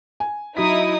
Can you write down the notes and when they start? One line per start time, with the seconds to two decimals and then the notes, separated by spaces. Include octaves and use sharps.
0.20 G#5
0.57 F#3 D#4 E4 D#6 B6